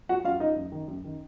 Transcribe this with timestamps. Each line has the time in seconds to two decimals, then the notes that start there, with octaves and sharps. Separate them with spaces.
0.09 F3 F#4 F#5
0.24 F#2 F4 F5
0.40 F3 D#4 D#5
0.56 F#2
0.72 D#3
0.88 F#2
1.04 D#3